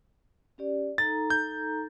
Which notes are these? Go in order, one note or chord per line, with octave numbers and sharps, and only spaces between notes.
C#4 G4 D5
D#4 A4 A#5 A6
G6